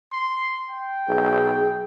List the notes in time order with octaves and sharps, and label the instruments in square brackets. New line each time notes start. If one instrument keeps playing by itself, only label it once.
[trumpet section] C6
G5
[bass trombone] B1 [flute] G#4